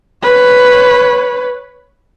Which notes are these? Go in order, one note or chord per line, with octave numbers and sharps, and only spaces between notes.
B4 C#5